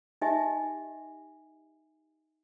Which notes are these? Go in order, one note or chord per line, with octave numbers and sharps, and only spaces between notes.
D#4 G4 D#5 E5 G#5